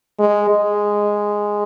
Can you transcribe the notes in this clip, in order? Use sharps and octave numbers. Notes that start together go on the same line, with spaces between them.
G#3
G#3